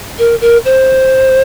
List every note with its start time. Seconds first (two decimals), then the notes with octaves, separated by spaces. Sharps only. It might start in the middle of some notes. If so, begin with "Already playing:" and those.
0.19 A#4
0.41 A#4
0.65 C5